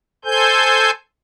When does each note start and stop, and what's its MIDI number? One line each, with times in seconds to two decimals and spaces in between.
0.25 0.91 69
0.25 0.91 72
0.25 0.91 80
0.25 0.91 91